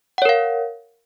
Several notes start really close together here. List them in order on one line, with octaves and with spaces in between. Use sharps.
F#5 C#5 A#4 F5